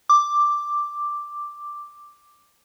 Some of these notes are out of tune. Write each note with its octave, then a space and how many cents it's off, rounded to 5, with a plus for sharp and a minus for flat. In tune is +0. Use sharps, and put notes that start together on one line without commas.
D6 +5